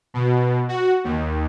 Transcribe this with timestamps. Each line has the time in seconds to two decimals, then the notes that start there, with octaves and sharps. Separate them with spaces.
0.14 B2
0.69 F#4
1.04 D#2